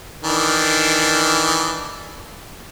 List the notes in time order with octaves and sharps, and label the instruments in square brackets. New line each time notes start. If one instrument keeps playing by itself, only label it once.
[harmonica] D#3 E3 D4